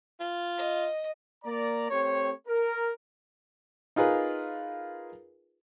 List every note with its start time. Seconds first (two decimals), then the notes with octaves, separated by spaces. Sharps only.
0.20 F4
0.58 D#5
1.44 A#3 D5 A#5
1.90 A3 C4 G4 C5 C#5
2.47 A#4
3.96 D#4 F4 G#4 A#4 B4